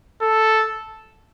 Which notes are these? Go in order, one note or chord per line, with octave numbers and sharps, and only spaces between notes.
A4